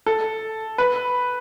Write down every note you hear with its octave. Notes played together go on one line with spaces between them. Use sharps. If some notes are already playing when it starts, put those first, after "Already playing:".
A4
B4